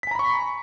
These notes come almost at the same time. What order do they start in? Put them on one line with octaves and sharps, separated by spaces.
B6 G#5 A#5 B5 C#6